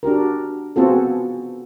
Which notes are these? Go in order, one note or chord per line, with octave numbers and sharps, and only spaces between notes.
D4 F#4 G4 A#4
B3 C4 F4 F#4 G#4 A4